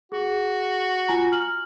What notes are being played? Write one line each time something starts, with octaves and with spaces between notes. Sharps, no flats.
F#4 G#4
F4 G#5 A#5
F6 F#7